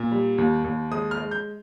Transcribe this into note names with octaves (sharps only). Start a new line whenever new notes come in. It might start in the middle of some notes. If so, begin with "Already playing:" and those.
Already playing: A#2
G3
D#2
D#2
G#3 D#6
F6
G#3
G6